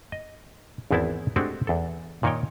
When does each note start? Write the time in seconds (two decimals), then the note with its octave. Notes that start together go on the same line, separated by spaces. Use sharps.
0.12 D#5
0.91 G#1 E2 B3 C4 E4 A5
1.36 G#3 A3 C4 D4 F#4 G4
1.67 E2 A4
2.23 A#2 D#3 D#4 C#5 G5